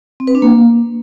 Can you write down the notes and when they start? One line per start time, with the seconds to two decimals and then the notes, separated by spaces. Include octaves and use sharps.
0.20 C4
0.27 B4
0.35 D4
0.42 A#3